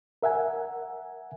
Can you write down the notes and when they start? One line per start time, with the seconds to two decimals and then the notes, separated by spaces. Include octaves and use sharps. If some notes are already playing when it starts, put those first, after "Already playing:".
0.23 A#4 E5 F#5 G#5